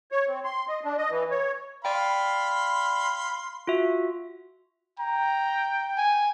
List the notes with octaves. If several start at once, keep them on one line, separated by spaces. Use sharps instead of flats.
C#5
C4
C6
D#5
D4
D#5
E3
C#5
D5 F5 G5 B5 C6
F4 F#4 E5
G5 A#5
G#5